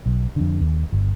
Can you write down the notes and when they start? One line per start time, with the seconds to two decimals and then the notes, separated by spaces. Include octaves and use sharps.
0.06 B1
0.36 F2 D3
0.60 D#2
0.92 G1